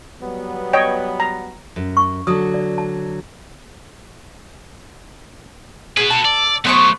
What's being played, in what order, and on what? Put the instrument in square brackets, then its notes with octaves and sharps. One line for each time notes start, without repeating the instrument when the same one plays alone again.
[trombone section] F#3 G3 B3
[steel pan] C#5 D#5 G5
A#5
[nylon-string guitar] F#2
[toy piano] C#6
[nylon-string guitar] D3 F#3 [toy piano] D#6
[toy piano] D5
A5
[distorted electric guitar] F#4 B4 [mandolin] G#4
[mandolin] A4
[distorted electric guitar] D5
[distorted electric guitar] F#3 A3 [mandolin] B3 C5 C#6